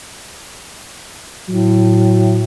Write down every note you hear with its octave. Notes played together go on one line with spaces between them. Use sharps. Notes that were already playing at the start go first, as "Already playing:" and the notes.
A2 F#3